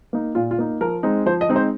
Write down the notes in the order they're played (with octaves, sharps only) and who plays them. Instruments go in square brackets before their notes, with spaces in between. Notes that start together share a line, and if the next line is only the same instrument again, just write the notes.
[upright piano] A#3 D#4
A#2 F4
F4
A#3 D#4
F3 A#4
G#3 C4 D#4
F3 C5
D#5
G#3 C4 D#4
C5